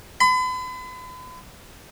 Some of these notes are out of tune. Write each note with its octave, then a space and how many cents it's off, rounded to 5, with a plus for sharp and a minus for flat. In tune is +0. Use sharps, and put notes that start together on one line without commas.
B5 +40